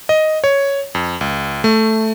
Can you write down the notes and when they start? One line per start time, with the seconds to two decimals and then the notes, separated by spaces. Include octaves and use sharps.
0.09 D#5
0.44 C#5
0.95 F2
1.21 C#2
1.64 A3